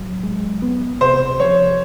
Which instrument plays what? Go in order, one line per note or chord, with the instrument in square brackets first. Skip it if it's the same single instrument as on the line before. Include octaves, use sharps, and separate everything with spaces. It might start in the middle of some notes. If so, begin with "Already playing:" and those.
Already playing: [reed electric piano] A2 F#3
G#3
B3
[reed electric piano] C3 [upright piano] C5
[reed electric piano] F3 [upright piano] C#5